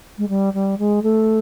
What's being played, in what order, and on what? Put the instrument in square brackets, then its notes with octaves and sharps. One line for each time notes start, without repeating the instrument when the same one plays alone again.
[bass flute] G#3
G3
G3
G#3
A3